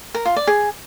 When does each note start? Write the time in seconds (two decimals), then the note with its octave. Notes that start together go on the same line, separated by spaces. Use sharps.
0.14 A#4
0.25 F4
0.36 D5
0.47 G#4